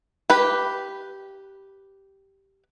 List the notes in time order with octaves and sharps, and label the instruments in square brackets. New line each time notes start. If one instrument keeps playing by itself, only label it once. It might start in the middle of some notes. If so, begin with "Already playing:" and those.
[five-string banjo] G4 B4